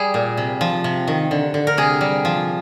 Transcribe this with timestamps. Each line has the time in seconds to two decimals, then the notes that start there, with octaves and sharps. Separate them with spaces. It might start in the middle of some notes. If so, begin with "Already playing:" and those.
Already playing: G3 G#4
0.14 A#2
0.37 C3
0.61 F3
0.84 C3
1.08 D#3
1.31 D3
1.54 D3
1.67 A#4
1.77 C3 G#4
2.01 G3
2.25 F3